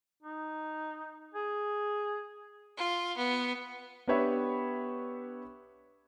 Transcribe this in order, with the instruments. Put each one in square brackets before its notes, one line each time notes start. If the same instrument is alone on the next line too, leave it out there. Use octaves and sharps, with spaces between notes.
[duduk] D#4
G#4
[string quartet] F4
B3
[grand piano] B3 D4 G4 B4 C#5 E5